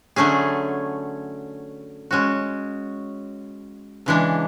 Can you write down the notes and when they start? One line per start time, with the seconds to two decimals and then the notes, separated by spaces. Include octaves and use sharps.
0.16 D3 F#3 A3 C#4 G#4
2.11 G#3 C#4 F#4
4.06 C#3 E3 G#3 D4